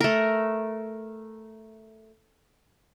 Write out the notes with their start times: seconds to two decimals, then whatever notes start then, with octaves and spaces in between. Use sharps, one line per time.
0.01 A3 A#4